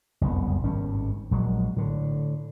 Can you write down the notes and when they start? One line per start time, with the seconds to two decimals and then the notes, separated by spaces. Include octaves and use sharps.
0.21 F#1 C2 F2 B3
0.63 G#1 G2 C#4
1.31 A#1 F#3 G#3
1.76 A2 D3